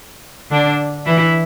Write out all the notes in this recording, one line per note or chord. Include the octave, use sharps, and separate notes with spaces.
D3 D4
E3 E4